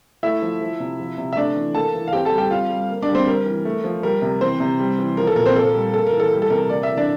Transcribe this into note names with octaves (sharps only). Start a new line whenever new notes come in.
A3 E4 E5
F3
F3
C3
F3
C3
E5
A3 D4 D5
E3
A#3 A4 A5
E3
F5
C4 G4 G5
A4 A5
G3
G4 G5
C4 F4 F5
G3
A#3
D4 D5
G3
C4 C5
G3 A#4
E3
A3
F3
G3 A#4
C3
E3 C4 C5
C3
G3
E3
F3 A#4
A4
A#2 A#4
C4 C5
A#3 A4
G3
A#3 A4
A#4
E3
A4
G3
A4
C3 A#4
A#3 D5
E5
E3
D4 D5